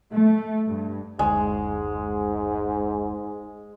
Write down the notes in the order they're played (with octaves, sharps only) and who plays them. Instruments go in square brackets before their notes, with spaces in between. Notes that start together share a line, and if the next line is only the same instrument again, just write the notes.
[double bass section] A3
G2
[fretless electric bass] F#1 D2 [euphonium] G#2 [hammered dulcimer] G#3